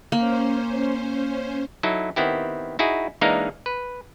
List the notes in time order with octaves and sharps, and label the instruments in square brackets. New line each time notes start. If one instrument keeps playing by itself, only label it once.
[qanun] A#3 [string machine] C#4 C5
[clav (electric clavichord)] F#3 D#4 E4 A4
D#3 B3 C4 E4 G4
D#4 E4 F#4 G#4
E3 G#3 A#3 D4 D#4 A#4
B4